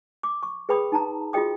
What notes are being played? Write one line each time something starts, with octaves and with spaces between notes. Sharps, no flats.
D6
C#6
G#4 B4 G5 B5 D#6
D#4 A5 A#5
F4 F#4 G#4 D#5 G5 D#6